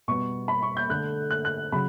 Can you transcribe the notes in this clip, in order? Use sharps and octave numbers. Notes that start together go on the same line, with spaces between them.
B2 G3 B3 C#6
B5
C#6
G6
D3 A3 F#6
F#6
F#6
C#3 F#3 B5